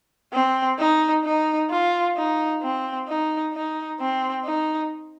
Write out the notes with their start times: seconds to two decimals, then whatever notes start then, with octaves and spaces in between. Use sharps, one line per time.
0.33 C4
0.78 D#4
1.24 D#4
1.70 F4
2.16 D#4
2.63 C4
3.08 D#4
3.53 D#4
4.00 C4
4.45 D#4